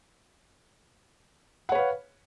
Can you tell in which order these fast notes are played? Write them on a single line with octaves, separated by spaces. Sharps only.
F#5 C#5 B4 F5